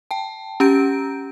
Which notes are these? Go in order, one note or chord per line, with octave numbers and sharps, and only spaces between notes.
G5 A5
C#4 G4 A#5 G6 D7